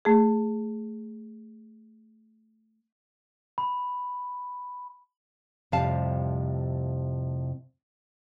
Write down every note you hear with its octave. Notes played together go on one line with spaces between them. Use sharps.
A3 G#4
B5
F2 A2 C3 G3 F5 A5